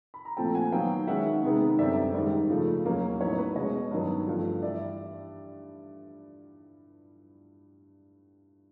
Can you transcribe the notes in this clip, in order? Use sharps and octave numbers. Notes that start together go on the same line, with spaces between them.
B5
A#5
A#2 F3 A3 C4 G5 A5
F#5 G#5
D#3 F#3 B3 F5 G5
D#3 G#3 C#4 E5 F#5
C3 D#3 G#3 B3 D#4
F#2 D3 G3 C4 D5 E5
G#2 D#3 G3
C#3 F3 A3
E2 B2 F#3 A#3 C#4
A2 F#3 B3 D#4 B4 C#5
B4
B2 G#3 C#4 C#5 D#5
G2 D#3 F#3 B3
G2 D3 F3 A3
G2 E3 G3 D5 E5